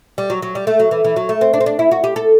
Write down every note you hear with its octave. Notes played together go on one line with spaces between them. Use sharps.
G3
F#3
F#3
G3
A3
F#3
E3
E3
F#3
A3
C4
D4
C4
D4
E4
F#4
G4
A4